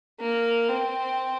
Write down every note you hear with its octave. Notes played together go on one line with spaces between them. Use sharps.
A#3
C4